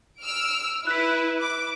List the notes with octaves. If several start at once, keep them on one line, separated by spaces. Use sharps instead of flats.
E6 F6 D7
E4 B4 F#6 B6
D6